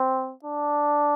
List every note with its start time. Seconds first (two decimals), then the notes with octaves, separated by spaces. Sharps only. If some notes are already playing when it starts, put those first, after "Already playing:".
Already playing: C4
0.44 D4